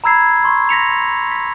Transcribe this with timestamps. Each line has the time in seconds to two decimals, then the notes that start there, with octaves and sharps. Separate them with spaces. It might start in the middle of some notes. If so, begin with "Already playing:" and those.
0.04 A#5 B5 E6 G#6 C7
0.44 C6 C#6
0.69 A#6 B6 C#7 F7
1.32 B6